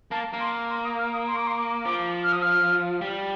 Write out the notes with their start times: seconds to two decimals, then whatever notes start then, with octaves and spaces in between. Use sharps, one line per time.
0.11 A#3 A5
0.33 A#3
0.40 C6
0.70 C6
0.84 D#6
0.99 F6
1.13 D#6
1.28 C6
1.37 D6
1.47 C6
1.57 D6
1.85 F3 D6
2.24 F6
2.33 D#6
2.42 F6
3.01 G3